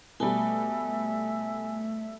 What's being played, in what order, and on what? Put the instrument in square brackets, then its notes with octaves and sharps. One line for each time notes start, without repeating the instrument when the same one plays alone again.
[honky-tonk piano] B2 G3 [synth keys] A3 [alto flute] E5 [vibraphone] G#5